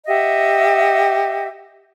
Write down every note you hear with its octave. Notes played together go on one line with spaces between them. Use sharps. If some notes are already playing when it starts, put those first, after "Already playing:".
G4 D#5 E5 F#5